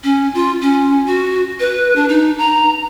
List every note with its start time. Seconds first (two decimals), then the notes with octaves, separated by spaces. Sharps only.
0.04 C#4
0.34 F4
0.61 C#4
1.06 F#4
1.60 B4
1.96 D4
2.09 D#4
2.38 A#5